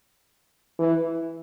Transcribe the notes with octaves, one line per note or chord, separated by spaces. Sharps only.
E3